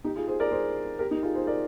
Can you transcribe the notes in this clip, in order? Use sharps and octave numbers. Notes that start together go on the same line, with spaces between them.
D#4 G4
F4 G#4
G#4 C5
A#4 D5
G#4 C5
G4 A#4
D#4 G4
F4 G#4
G#4 C5
A#4 D5